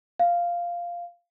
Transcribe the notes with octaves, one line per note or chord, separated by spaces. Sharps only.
F5